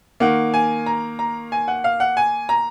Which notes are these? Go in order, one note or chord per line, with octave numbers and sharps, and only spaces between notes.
D#3 A#3 F#5
G#5
A#5
A#5
G#5
F#5
F5
F#5
G#5
A#5